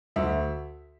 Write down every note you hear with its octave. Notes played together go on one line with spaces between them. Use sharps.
D2 E5